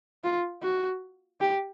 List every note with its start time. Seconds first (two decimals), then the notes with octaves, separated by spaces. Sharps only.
0.24 F4
0.63 F#4
1.41 G4